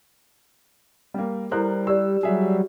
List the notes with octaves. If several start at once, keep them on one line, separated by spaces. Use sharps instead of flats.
G3 A#3
G3 E4 A4 A#4 C5 F#6
G4 D5 E6
F#3 G3 G#4 E5